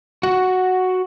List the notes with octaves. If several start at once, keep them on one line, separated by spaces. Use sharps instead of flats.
F#4 F#5